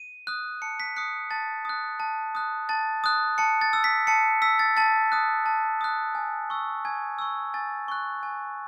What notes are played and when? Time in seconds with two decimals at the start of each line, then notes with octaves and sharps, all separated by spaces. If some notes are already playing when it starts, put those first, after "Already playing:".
Already playing: D#7
0.27 D#6 F#6
0.62 A5 C#7
0.80 B6
0.96 D#6 F#6 C#7
1.31 A5 A6
1.65 D#6 F#6
2.00 A5
2.35 D#6 F#6
2.69 A5 A6
3.04 D#6 F#6
3.38 A5 C#7
3.61 A6
3.73 E6
3.84 B6
4.07 A5 C#7
4.42 E6 B6
4.59 A6
4.77 A5 A6
5.12 D#6 F#6
5.46 A5
5.81 D#6 F#6
6.15 G#5
6.50 C#6 E6
6.85 G#5 G#6
7.19 C#6 E6
7.54 G#5 A6
7.88 C#6 F#6
8.23 G#5